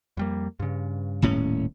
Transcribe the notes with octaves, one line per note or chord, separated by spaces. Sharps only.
F2 G3 A#3
G2 C#3
D#1 A2 C#4